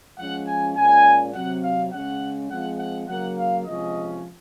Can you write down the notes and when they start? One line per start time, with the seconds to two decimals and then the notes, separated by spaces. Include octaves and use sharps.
0.18 F3 G#3 C#4 F#5
0.46 G#5
0.75 A#2 G#3 C#4 G#5
1.34 C3 F#3 C4 F#5
1.63 F5
1.92 C#3 G#3 C#4 F#5
2.50 F3 G#3 C4 F#5
2.79 F#5
3.08 C#3 F#3 A#3 F#5
3.37 F5
3.66 C3 F3 G#3 C#4 D#5